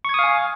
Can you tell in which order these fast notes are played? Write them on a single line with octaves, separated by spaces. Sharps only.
C#6 G#6 D#6 F5 G#5